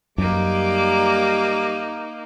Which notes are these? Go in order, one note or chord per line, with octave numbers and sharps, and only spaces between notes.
F#2 G3 A#3 D#4 D6